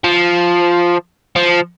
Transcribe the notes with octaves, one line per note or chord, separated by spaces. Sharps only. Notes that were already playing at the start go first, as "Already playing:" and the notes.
F3
F3